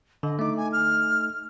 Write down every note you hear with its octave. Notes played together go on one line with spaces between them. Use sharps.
D3 D#5
A3 D#4 D6
G#5
F6